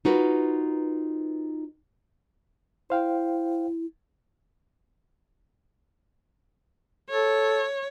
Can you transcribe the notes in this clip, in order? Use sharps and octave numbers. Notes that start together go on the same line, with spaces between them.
D#4 F4 F#4 A#4 B4
E4 C5 F5 G5
A4 C#5